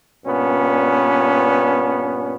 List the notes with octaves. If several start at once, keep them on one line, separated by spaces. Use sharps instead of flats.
G2 A#2 B3 C#4